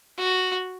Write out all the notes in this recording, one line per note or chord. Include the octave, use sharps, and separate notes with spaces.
F#4